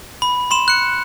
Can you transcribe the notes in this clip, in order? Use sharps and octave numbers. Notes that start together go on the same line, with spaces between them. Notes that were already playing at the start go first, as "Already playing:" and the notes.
B5
B5 C6 E7
F#6 C#7